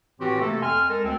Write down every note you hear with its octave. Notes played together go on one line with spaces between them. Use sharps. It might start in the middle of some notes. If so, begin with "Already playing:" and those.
A2 E3 C4 F#4 G4
C3 A3 A#3 A4
F2 G#5 C6 F6
G#3 A4 A#4
D2 C4